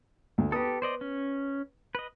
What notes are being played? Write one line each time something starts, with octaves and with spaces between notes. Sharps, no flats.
D2
B3 G4 A4 B4 D#6
C5 D5 D#5
C#4
B4 D#5